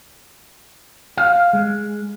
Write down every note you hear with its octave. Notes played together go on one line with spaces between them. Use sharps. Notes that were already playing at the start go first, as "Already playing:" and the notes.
F5
G#3